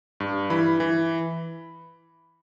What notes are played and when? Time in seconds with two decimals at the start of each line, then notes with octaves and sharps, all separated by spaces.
0.20 G2
0.50 E3 B5
0.80 E3